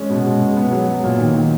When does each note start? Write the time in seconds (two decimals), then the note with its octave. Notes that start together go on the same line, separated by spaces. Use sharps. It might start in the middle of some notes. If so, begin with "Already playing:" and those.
Already playing: G#3 C#4
0.10 B2
0.25 G#3
0.40 B2
0.57 B3
0.71 F#3
0.87 F#3
1.04 A#2
1.19 D#3
1.34 D#3